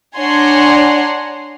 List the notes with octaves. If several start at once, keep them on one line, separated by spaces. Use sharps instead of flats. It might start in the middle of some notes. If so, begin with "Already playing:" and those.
D4 C#5 F#5 G#5 A#5 C6